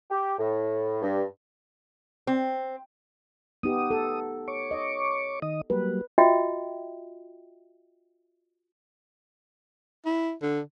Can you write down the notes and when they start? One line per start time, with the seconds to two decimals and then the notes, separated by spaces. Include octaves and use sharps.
0.10 G4
0.39 A2
1.02 G2
2.27 C4
3.63 B3 D#4 G4 D#6
3.91 A4
4.48 C#5 C#6 D6
4.71 D#5
5.42 D#3 D#5 D#6
5.70 F#3 G3 A#3 B4
6.18 F4 F#4 D#5 E5 G5
10.06 E4
10.42 D3